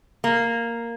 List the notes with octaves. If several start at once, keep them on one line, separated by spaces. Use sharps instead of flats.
A#3